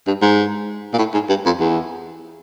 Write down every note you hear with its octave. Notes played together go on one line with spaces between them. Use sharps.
G2
G#2
A#2
A2
G#2
G2
F2
E2